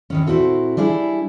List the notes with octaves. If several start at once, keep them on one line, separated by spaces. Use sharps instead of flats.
E2 D#3 C#4
A#2 C4 C#4 E4 F#4 A4
G3 D4 E4 G#4